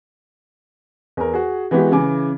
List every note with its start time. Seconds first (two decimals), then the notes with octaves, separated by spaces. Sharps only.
1.17 E2 A#4
1.33 F#4 G#4
1.71 E3 G#3 B3 F#4 G4
1.92 C#3 E3 G#5 D6